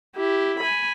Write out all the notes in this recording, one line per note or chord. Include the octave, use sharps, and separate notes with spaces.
E4 G4
G#5 B5